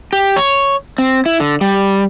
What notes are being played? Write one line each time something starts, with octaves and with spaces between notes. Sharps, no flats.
G4
C#5
C4
E4
D3
G3